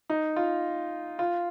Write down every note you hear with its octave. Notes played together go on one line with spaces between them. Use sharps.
D#4
F4
F4